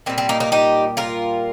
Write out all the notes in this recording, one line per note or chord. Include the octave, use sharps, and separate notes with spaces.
A#2 G3 C4
C4
A#3 D#4
A#3 D#4
D#4 G4
F4 A#4